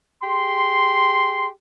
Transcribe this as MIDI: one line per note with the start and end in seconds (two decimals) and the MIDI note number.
0.23 1.46 67
0.23 1.46 68
0.23 1.46 84